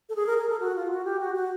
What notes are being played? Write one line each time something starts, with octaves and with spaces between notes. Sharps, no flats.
A4
G#4
A#4
A#4
A4
F#4
F4
F#4
G4
F#4
F#4